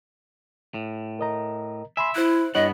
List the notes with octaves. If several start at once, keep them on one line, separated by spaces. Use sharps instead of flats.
A2
A#4 D#5 A#5
E5 G#5 B5 C6
E4 C5 F#6
G2 B3 E4 C#5 D#5 F#5